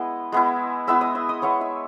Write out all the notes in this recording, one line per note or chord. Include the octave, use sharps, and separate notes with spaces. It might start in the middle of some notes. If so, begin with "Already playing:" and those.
Already playing: G#3 B3 E4 D#5
G#3 B3 E4
G#3 B3 E4 E5 E6
D#5 D#6
E5 E6
D#5 D#6
G#3 B3 E4 C#5 C#6
E5 E6